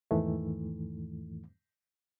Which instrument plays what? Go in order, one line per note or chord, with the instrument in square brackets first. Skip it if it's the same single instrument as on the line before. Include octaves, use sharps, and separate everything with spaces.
[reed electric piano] E2 G#2 D#3 E3 A3